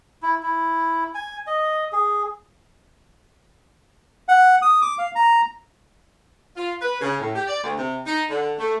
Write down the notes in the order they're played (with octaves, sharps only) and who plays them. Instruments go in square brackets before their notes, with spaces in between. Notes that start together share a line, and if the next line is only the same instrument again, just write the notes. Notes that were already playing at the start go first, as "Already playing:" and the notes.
[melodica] E4
E4
G#5
D#5
G#4
[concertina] F#5
D#6
D6
F5
A#5
[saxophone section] F4
B4
C#3
A2
G4
D5
D2
C3
D#4
D3
A3